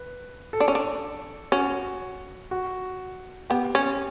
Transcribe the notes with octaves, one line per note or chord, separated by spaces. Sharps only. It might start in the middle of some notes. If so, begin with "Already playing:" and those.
Already playing: B4
A4
D4
C#4
D4
C#4 F#4
F#4
B3 G4
C#4